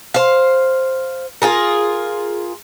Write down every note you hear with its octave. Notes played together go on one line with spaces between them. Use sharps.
C5 F5
F4 G#4 A#4